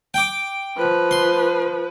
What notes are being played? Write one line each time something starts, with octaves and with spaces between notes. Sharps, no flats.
G5 D6
F3 B4
C6